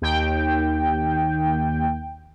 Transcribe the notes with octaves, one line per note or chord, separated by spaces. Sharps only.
D#2 G5